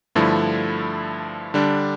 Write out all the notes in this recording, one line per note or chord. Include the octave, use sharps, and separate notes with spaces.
G2 D3 F3 A3 E4
D3 G3 D4